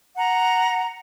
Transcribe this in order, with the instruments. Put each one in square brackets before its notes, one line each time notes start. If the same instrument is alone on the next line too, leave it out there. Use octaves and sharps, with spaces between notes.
[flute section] F#5 A#5